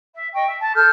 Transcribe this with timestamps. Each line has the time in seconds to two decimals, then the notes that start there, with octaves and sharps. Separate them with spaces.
0.15 E5
0.33 D#5 G5 C#6
0.47 E5
0.60 A5
0.75 A4 F6 G6